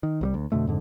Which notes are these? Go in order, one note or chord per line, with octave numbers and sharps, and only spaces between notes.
D#3
C2 F#3 G3
D2
F2 B2 D3 A3
F2 G#2 D3